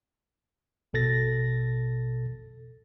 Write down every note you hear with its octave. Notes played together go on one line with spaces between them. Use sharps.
A1 B2 A4 A6 A#6